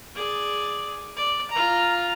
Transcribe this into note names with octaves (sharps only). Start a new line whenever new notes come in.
G#4 D5
D5
F4 A#5